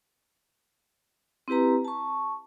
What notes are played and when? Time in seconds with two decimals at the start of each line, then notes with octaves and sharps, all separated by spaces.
1.48 C4 E4 G4 B4 A#5
1.85 A5 C#6